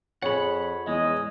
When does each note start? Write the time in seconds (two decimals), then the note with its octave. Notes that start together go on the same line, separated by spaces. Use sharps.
0.22 F2 G#4 C#5 F#5 B5
0.87 E2 G#3 D#5